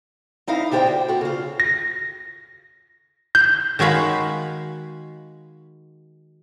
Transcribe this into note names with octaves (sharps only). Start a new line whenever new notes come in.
C4 D#4 E4 F5
D3 D4 G4 A#4 C5 G5
F#4
F#4 A4
C#3 F4
A#6
G6
D#3 G#3 F#4 F5 B5